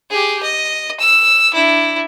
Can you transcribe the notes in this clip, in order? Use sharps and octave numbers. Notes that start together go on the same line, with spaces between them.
G4 G#4
D#5
E6
D4 E4